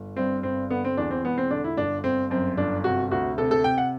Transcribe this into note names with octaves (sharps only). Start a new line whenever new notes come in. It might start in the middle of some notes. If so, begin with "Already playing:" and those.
Already playing: G1
G2 C4
G1 C4
D3 B3
C4
E2 D4
C4
E1 B3
C4
D3 D4
E4
G1 D4
G1 C4
F#2 C4
G1 D4
C3 F#4
D2 F#4
C3 A4
A4
C3 G5
F#5